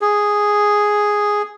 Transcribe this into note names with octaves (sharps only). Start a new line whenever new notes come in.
G#4